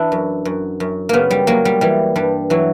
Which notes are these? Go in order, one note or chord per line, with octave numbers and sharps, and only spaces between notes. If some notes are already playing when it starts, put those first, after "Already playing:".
Already playing: E3 D4 E4
F#2
F#2
F#2
C#3 A#3 B3
G3
F#3 A#3
G3
E3 G3
G2 G3
E3 F#3